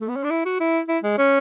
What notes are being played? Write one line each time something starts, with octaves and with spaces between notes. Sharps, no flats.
A3
B3
C#4
D4
E4
F#4
E4
E4
G#3
C#4